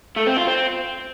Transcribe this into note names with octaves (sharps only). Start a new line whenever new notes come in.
A3
C4
F4
C4